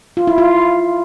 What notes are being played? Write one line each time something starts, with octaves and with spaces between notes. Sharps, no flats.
F4
E4
F4